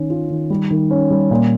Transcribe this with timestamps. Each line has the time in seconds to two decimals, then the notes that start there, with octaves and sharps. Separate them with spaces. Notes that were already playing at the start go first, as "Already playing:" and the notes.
Already playing: D#3 C#4
0.10 F4
0.30 D#3
0.50 G3
0.71 D#3
0.91 C#4
1.11 G3
1.31 A#2